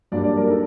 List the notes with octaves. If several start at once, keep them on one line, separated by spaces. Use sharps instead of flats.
G2 F#3 A#3 D4 D5
D5
A#4
D#4 A4